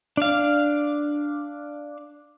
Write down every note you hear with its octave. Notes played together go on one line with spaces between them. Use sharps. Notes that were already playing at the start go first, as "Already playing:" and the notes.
D4 F5